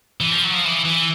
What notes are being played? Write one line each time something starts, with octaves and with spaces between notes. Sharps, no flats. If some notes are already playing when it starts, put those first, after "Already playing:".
E3
F3
F#3
F3
E3
E3